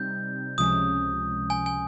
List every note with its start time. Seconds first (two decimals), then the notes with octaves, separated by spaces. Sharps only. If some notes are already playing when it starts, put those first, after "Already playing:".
Already playing: C3 G3 C4 D#4 G6
0.58 C#2 C3 F3 G#3 C#4 D#6
1.50 G#5
1.66 G#5